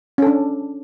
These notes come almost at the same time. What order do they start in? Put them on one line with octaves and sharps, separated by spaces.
C#4 A4 D4